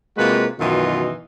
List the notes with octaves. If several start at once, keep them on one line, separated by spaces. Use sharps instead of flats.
C3 G#3 A#3 F4 F#4 B4
F#2 B2 D#3 E3 F4 D#5